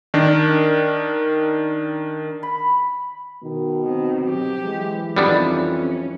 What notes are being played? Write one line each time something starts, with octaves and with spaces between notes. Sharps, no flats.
D#3 D4 A#4
B5
B2 D#3
D#3 C4
F#3 G4
E3 G#3
F2 D#3 G3 B3 C4 D4
C#4